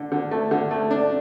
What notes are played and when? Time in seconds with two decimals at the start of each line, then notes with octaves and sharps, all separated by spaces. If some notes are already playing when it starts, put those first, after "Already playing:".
Already playing: D3
0.12 D3
0.31 A3
0.51 D3
0.71 A3
0.91 D4